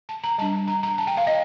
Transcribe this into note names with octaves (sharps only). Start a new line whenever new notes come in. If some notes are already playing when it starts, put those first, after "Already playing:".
A5
A#5
G3 D4 A5
A#5
A#5
A5
G5
F5
D#5